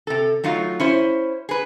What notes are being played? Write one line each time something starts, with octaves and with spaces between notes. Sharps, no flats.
C3 A4
F#3 A3 D#4 F4
C#4 E4 C5
G#4 B4